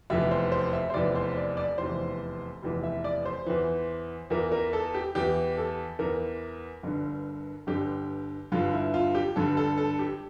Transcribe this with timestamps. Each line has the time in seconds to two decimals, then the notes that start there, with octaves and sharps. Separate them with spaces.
0.10 F1 E2 E3 E5
0.31 C5
0.52 C5
0.73 E5
0.90 C5
0.94 F1 E2 E3 D5
1.15 C5
1.37 D5
1.57 D5
1.78 F1 E2 E3 C5
2.63 F1 E2 E3
2.83 E5
3.04 D5
3.25 C5
3.46 E2 E3
4.30 E2 E3 A#4
4.52 A#4
4.73 A4
4.95 G4
5.15 E2 E3 G4
5.57 A4
5.99 E2 E3 A#4
6.83 G1 G2 D3
7.67 G1 G2 D3 G4
8.52 G1 G2 D3 F4
8.73 E4
8.94 F4
9.15 G4
9.36 G1 G2 D3 A4
9.57 A4
9.78 A4
9.99 G4